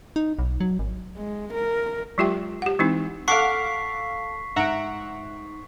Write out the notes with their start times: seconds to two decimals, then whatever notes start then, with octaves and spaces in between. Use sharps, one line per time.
0.16 D#4
0.39 B1
0.60 F#3
0.79 G#1
1.17 G#3
1.53 A#4
2.18 F#3 G#3 F4 G4 E5 G5
2.62 G4 F#5
2.79 E3 G#3 C4 D#4 E4
3.28 A4 F5 F#5 C#6 D6 F6 B6 C7
4.56 G#2 E5 F#5 A#5 D7